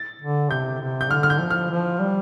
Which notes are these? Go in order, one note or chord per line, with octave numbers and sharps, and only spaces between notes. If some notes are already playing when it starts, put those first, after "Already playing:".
Already playing: A6
D3
C3 G6
C3
G6
D3 F6
F6
G6
F3
F6
F3
G3